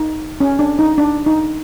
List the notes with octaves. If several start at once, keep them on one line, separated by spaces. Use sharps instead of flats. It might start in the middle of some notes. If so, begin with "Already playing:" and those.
Already playing: D#4
C#4
D4
D#4
D4
D#4